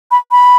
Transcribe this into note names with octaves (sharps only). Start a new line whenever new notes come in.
B5
B5